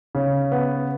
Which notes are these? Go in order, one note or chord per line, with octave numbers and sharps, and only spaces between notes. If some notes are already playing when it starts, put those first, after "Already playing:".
C#3
B3